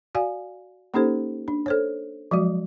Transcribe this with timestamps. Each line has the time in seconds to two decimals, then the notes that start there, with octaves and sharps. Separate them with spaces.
0.15 F#4 D5 F5 G#5
0.94 A#3 C#4 D#4 G4 A4 C5
1.48 D4
1.66 A4 C5 C#5
2.31 F3 F#3 G#3 F#4